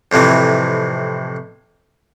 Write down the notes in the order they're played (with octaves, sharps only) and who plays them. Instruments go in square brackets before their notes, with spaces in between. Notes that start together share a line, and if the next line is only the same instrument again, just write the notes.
[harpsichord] F2 A2 C3 E3